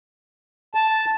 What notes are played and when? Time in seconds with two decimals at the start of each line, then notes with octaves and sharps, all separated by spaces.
0.75 A5